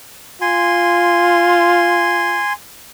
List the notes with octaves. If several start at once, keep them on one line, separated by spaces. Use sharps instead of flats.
F4 G#5 C6